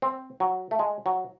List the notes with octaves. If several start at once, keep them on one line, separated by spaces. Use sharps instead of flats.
C4
F#3
A3
G#3
F#3